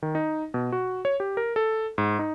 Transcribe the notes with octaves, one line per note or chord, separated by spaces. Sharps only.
D#3
D#4
B2
F#4
C#5
G4
A#4
A4
G#2
D#4